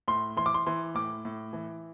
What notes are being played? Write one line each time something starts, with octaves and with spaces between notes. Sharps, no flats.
A2 C6
E3 C6
D6
C6
E3 C6
A2 D6
A2
E3